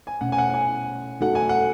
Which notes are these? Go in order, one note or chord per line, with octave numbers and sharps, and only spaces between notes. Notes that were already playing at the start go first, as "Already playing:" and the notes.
G#5
B2 A3 C#4 F#5
G#5
F#5
G#5
A3 D#4 F#4 A4 F#5
G#5
F#5